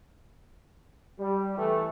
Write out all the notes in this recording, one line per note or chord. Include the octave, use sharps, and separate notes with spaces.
G3
E3 A3